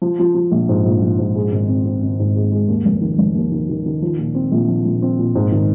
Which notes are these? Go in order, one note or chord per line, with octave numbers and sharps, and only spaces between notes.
F3
F3
F3
A#1
G#2
A#1
A#1
G#2
G#3
G#1
C4
C4
G#1
G#2
G#3
G#3
D#2
F1
D#3
F1
D#2
D#3
D#3
D#3
F3
A#2
C4
A#1
F3
A#1
C4
A#2
G#2
D#3